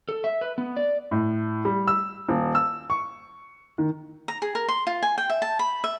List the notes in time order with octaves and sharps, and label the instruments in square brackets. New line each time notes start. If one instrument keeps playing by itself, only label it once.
[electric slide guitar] A4
E5
B4
B3
D5
[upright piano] A2
G3
E6
D#1
E6
C#6
D#3
[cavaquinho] A#5
G#4
A#4
C6
F4
G#5
G5
E5
A5
B5
E5